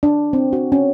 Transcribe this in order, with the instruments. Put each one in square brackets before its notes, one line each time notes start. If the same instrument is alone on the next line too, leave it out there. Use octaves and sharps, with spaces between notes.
[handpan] D4
C4
F#4
C#4